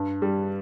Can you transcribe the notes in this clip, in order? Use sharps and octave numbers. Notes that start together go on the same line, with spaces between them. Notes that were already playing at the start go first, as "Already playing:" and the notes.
Already playing: G2
G3